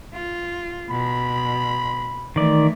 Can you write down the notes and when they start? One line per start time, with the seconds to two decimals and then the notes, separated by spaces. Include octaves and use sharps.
0.14 F4
0.90 B2 B5
2.36 D#3 E3 A3 D5